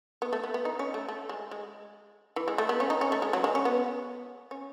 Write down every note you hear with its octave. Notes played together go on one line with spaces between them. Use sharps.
B3
A3
B3
B3
D#4
C#4
A3
A3
G#3
G#3
E3
G#3
A3
B3
C#4
D#4
C#4
A3
G#3
F#3
G#3
C#4
B3
C#4